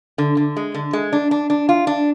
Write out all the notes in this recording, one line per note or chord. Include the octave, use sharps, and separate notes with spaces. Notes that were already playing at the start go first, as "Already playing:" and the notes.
D3
D3
G#3
D3
G#3
D4
D4
D4
F4
D4